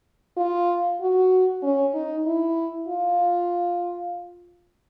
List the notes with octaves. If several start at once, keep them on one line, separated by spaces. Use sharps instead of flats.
F4
F#4
C#4
D#4
E4
F4